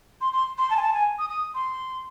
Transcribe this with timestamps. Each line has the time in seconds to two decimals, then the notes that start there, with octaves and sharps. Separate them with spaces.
0.21 C6
0.33 C6
0.58 C6
0.70 A5
0.76 G#5
0.82 A5
0.93 G#5
1.19 D#6
1.30 D#6
1.54 C6